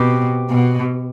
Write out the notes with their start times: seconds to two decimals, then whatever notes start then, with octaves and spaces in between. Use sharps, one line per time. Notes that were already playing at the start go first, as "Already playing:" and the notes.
Already playing: B2 C4 G4 B4
0.50 B2